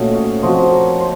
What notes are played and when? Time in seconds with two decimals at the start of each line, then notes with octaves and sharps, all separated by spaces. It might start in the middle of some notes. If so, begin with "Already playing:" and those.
Already playing: A#2 A3 C#4 F#4 A4 D#5
0.13 C#5 F5
0.42 F3 C4 F#4 C5 D#5
0.71 A#4 C#5
1.00 C5